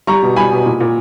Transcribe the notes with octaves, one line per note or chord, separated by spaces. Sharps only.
G3 A#5 C#6
B2
G3 G#5 B5
B2
A#2
A#2